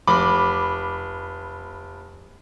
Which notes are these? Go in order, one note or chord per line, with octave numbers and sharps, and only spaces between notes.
F1 B5 D6